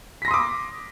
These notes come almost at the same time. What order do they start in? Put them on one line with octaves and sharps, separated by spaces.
B6 A#6 C6 D#6 D6